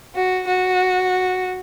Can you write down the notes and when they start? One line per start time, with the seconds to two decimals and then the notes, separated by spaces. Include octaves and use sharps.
0.15 F#4
0.47 F#4